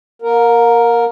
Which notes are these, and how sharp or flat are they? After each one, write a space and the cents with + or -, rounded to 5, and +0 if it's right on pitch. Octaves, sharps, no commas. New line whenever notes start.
A#3 +40 A#4 +0